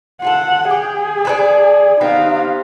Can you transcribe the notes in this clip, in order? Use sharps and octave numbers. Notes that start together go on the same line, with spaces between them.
F4 G#4 A4 F#5
G4 G#4
A4 B4 D5
B3 C4 D#4 G4 F5